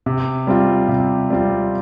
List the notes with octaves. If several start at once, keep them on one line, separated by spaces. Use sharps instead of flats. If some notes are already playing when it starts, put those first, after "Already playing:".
C3
G3 C4 F4
C3
G3 C4 F4